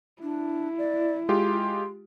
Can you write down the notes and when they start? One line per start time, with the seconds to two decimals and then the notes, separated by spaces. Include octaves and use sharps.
0.23 D4 E4
0.78 D5
1.29 G#3 F4 G4 C6